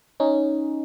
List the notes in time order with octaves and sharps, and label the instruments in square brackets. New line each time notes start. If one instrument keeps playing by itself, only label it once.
[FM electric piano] C#4 D#4